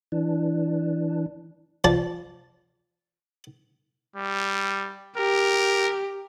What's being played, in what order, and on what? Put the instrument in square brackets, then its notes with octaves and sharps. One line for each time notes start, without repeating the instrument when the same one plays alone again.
[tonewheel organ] E3 D4
[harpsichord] F3 D5 A5
[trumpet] G3
[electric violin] G4 [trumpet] A#4